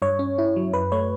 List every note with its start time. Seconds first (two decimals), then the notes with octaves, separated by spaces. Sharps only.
0.02 G2 C#5
0.19 C#4
0.38 E4
0.56 F#3
0.73 F#2 B4
0.92 A3 C#5